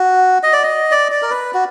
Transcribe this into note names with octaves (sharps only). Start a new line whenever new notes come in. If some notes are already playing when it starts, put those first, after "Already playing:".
Already playing: F#4
D#5
D5
D#5
D5
D5
A#4
B4
F#4